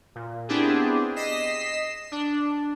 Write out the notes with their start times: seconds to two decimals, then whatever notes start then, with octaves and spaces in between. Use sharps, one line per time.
0.15 A#2
0.48 B3 C4 D4 E4 G4 G#4
1.16 D#5 B6 C7 E7
2.12 D4